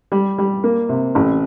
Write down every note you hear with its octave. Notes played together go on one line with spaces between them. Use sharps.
G3
G3
A#3
C3
A1